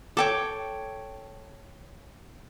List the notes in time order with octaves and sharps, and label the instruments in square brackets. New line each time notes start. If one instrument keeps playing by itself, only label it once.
[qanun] A4 [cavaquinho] C#5 G5 D6